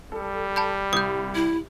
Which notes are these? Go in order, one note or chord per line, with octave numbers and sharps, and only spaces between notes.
G3 A4
A5 B5 G6
C2 D#6 G6
E4